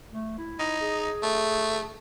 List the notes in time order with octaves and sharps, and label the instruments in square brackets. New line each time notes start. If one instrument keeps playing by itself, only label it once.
[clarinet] A3
E4
[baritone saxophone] D#4
[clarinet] G#4
[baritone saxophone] A3